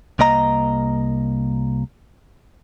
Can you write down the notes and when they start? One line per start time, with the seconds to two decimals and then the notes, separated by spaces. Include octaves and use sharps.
0.19 C2 A#3 D#5 A#5